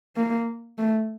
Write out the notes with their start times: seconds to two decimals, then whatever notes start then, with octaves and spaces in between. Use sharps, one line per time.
0.16 A#3
0.78 A3